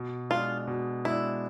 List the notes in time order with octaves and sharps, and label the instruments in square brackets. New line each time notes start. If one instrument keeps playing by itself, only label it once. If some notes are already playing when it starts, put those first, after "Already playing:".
Already playing: [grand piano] B2
[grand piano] G#3 D4 [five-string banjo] F4
[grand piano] B2
[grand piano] G#3 D4 [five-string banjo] E4